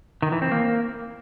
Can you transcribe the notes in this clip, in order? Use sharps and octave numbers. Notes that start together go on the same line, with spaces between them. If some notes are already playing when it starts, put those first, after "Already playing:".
D#3
E3
C4
A#3